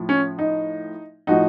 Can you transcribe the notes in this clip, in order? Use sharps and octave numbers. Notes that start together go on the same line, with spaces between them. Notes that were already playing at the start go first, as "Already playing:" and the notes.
Already playing: A2 F3
C#4
D#4
A2 F3 D#4 F#4